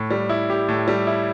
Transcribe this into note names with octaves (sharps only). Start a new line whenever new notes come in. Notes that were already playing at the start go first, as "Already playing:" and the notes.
Already playing: A2
G3
E4
G4
A2
G3
E4